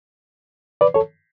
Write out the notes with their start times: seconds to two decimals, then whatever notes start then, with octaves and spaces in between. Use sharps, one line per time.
0.81 B4 D5
0.94 A4 C#5